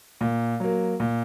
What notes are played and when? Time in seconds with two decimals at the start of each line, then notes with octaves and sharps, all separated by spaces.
0.21 A#2
0.60 F#3 A#3
1.00 A#2